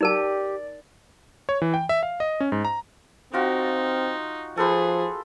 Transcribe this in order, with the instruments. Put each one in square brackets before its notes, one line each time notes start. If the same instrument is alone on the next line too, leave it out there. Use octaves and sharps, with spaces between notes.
[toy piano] D#4 A#4 A5 [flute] G4 [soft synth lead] D5
[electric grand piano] C#5
E3
G5
E5
F5
D#5
C#4
G#2
A#5
[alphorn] C4 [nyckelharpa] D#4 [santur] F4 F#4 G5
[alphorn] F3 [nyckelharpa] G#4 [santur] A4 B4 C5